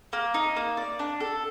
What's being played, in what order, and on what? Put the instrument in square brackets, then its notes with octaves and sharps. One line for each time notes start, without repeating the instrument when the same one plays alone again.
[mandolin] A#3
D#4
A#3
D5
D4
A4